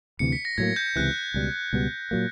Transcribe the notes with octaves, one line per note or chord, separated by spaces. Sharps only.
D2 C3 E3 C#7
B6
A#6
A2 F#3 A#3 G#6
G6
C#2 C3 E3 F#6
C#2 B2 G3
C#2 B2 G3 B3
A#2 F#3 A#3